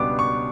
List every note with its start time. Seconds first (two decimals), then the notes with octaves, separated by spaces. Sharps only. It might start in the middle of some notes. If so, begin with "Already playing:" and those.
Already playing: C#2 B2 G3 B3 D4 D6
0.19 C#6